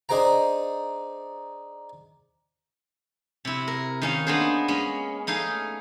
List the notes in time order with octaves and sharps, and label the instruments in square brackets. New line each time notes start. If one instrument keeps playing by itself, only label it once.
[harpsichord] D4 D#4 G#4 C5 G5 A#5
[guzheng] C3 E4
A#4
D#3 C#4 F5
A#3 B3 D4 G#4 C5
G#3 C#4
A3 D#4 G#4 F5